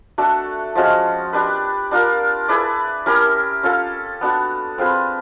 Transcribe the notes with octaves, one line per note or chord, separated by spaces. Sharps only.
A3 D4 F#4 A4
F3 G#3 C#4 F#4
D4 G4 B4
D4 F4 A#4
E4 G#4 B4 D5
C#4 E4 G4 A#4
C#4 F4 A4
B3 D4 F#4
C4 F4 G#4 B4